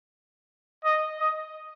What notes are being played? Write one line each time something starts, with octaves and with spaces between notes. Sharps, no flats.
D#5
D#5